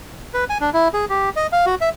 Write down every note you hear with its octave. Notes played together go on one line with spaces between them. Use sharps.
B4
G#5
D4
E4
G#4
G4
D#5
F5
F#4
E5